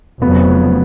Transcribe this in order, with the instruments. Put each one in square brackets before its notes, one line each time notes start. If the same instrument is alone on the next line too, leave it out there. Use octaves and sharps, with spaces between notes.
[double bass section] F1 F2 C#3 F#3 [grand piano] B3